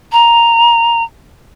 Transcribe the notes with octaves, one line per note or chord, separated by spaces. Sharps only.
A#5